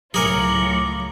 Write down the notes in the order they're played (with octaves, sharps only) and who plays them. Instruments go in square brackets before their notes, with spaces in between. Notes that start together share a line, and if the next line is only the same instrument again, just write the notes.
[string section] C#2 A2 F4 [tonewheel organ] F#3 [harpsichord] G#4 A#4 G#5 [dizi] D6